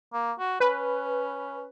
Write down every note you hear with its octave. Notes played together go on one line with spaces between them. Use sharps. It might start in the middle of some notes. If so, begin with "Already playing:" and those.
A#3
F#4
C#4 B4